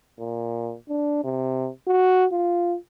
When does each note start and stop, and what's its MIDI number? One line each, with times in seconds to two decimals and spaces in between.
0.19 0.75 46
0.89 1.21 62
1.24 1.68 48
1.88 2.25 66
2.32 2.77 65